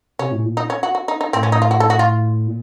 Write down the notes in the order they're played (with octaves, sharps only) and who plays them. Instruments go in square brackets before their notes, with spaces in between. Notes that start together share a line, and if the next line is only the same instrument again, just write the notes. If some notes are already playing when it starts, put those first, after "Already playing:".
[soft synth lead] C3 [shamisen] C#4
[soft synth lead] A2
A#2
[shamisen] D#4
C#4
F#4
F#4
D#4
D#4
[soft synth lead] A2 [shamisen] C4
[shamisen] C#4
D#4
F4
F#4
A4
F#4
F4
[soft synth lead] A#2